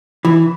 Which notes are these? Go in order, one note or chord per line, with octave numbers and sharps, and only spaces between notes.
E3